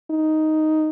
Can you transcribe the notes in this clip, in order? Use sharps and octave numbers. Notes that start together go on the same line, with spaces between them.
D#4